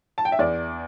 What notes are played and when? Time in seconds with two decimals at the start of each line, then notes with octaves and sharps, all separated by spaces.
0.18 A5
0.25 G5
0.32 E5
0.39 E2 D5